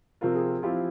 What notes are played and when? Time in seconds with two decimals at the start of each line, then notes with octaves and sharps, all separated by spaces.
0.21 C3 F3 C4 F4 A#4
0.35 G#4
0.62 F3 C4 E4 F4 G4